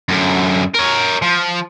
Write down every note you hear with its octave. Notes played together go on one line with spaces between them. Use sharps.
F#2 D3
A#4 C#5
F3